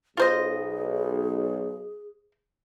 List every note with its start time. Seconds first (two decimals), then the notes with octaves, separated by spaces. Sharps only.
0.17 B1 F4 G#4 C5 D#5